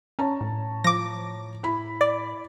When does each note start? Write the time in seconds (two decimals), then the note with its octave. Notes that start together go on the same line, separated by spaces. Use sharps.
0.19 C#4 C#5 A5 A#5
0.41 A2
0.84 F3 D6 A#6
1.63 E4 B5
2.01 D5